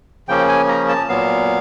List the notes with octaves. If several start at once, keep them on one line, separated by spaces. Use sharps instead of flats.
C#3 F3 A#3 C#4 G5
G#5
A#5
A5
A#2 F#3 B3 F5